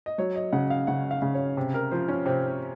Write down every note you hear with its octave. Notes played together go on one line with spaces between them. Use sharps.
D#5
F#3 C#5
D#5
C#3 F#5
F5
C#3 F#5
F5
C#3
C#5
C3
A#4
F3 C5
C#4
C3 C4
C4